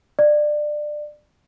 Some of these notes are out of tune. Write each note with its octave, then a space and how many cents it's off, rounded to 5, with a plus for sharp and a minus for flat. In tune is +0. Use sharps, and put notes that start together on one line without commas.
D5 +25